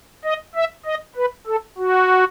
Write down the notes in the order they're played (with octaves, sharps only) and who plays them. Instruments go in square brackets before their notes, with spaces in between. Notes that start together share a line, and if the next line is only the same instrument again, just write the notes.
[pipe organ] D#5
E5
D#5
B4
A4
F#4